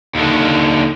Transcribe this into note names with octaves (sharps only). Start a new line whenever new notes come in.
D#2 D3